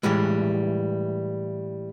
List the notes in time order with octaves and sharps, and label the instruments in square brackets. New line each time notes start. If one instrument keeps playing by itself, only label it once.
[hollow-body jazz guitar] A2 E3 G3 G#3